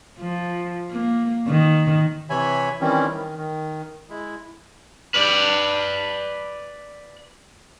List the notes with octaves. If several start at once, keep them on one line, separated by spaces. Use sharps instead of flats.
F3
A#3
D#3
C3 E3 C#5 E5 G#5 B5
D#3 E3 G3 C4 C#4 E4
D#3
D#3
G#3 E4
B4 D5